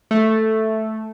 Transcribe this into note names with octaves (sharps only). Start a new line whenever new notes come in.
A3